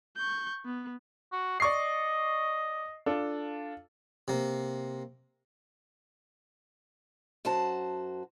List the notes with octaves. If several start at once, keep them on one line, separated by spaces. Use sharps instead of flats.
C#6 G6
B3
F#4
D5 D#5 C#6 C7
D4 F4 A4
C3 A#3
F#2 F#4 C5 A5